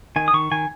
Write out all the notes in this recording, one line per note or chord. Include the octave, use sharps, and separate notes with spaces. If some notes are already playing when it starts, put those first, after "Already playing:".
D#3 G#5
D#6
D#3 C#6
D#3 G#5